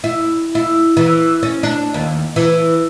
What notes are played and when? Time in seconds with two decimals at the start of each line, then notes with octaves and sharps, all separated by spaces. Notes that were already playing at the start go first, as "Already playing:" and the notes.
0.04 E4
0.55 E4
0.97 E3
1.43 C#4
1.63 D4
1.94 D#2
2.36 E3